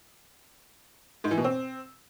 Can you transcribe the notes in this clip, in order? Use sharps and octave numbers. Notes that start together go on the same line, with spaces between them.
G#2
E3
B2
C4